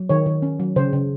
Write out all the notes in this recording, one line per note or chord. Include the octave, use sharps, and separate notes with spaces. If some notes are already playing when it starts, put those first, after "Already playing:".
Already playing: F#3
D#3 C#5
D#3
C#4
F#3
C#3 C5
C#3